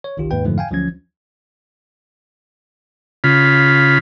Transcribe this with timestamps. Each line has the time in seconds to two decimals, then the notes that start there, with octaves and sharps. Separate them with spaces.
0.04 C#5
0.17 G1 C2 D#3 F4 G4
0.31 D#2 G#2 B4 G5
0.44 F2 G#2 D3 F3 A3
0.58 F5 G5 G#5
0.71 D2 F3 F#3 C#4 G#6
3.24 C#3 F4 B5